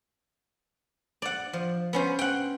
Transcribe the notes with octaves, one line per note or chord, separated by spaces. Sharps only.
D5 F#5
F3
B3 C#4 C5
F#5 G5